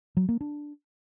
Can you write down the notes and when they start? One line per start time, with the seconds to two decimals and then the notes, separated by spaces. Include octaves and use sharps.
0.17 F#3
0.29 A#3
0.41 D4